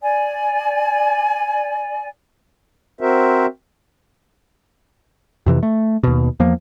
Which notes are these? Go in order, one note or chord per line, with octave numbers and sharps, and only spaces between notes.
D5 G#5
C4 F#4 A#4 C5 E5
F2 C3 E3
A3
D#2 B2
E2 F3 A#3